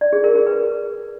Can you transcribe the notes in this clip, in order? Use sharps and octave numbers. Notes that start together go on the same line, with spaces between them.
D5
G#4
A#4
G#4
B4